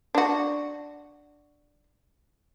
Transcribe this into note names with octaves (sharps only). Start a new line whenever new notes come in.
D4 F#4